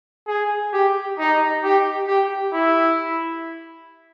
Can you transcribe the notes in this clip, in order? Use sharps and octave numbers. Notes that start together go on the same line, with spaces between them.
G#4
G4
D#4
G4
G4
E4